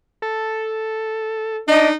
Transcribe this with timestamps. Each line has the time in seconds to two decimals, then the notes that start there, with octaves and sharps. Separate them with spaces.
0.22 A4
1.67 D4 D#4 D#5